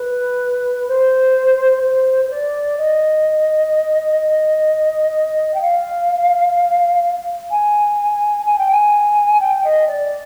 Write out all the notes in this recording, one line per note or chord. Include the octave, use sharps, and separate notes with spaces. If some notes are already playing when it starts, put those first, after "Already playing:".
Already playing: B4
C5
C5
C5
D5
D#5
G5
F5
G#5
G#5
G5
G#5
G5
D#5
D5